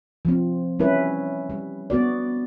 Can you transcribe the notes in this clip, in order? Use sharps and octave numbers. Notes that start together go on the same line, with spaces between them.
F3 C4
G3 C#4 E4 B4
G3
B3 F#4 D5